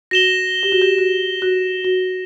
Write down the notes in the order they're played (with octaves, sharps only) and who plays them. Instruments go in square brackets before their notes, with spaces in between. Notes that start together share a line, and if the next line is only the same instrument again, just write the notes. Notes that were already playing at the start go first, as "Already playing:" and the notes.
[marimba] F#4 [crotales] A#6 E7 G7
[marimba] G4
F#4
G4
F#4
F#4
F#4